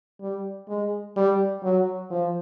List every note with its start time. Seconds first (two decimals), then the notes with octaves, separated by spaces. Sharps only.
0.21 G3
0.68 G#3
1.16 G3
1.63 F#3
2.11 F3